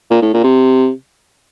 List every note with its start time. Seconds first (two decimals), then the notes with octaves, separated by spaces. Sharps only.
0.11 A#2
0.22 A2
0.34 A#2
0.44 C3